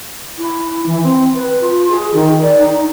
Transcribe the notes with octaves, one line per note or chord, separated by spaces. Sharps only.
E4
E3
C4
B4
F4
G#4
D#3
D5
D#4
D#4